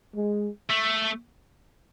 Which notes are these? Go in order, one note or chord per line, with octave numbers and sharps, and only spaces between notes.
G#3
A3